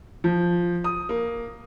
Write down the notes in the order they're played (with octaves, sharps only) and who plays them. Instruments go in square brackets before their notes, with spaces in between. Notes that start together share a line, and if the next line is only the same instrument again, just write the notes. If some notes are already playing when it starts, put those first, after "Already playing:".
[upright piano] F3
D#6
A#3